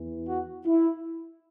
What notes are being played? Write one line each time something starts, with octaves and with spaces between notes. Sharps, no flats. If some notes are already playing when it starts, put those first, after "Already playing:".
Already playing: E2 E3
F#4
E4